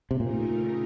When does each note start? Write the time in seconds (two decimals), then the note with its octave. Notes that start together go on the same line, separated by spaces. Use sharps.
0.11 C3
0.20 A#2 C#3 A3 D#4 A#4